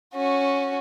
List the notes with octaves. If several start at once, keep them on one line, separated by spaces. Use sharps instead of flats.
C#4 F#4